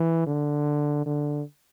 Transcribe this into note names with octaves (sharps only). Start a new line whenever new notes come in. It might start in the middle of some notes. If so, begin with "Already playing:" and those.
Already playing: E3
D3
D3